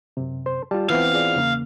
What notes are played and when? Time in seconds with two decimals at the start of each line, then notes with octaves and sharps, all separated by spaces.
0.17 F#2 C3
0.46 C5
0.71 G3 F4 A5
0.90 E3 B3 C4 F5
1.13 F4 G#4 D5
1.36 E2 C#3 A#3